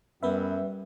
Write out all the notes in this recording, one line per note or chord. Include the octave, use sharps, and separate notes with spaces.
F#2 G3 B3 B4 E5